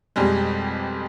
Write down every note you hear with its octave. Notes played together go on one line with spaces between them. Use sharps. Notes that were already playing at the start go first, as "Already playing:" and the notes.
F2 B2 G3 G#3